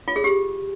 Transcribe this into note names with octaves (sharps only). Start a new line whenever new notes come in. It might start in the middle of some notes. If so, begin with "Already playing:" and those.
F4
G#4
G4